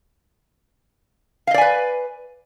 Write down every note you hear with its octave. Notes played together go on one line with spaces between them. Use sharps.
B4 D5 D#5 F5 G#5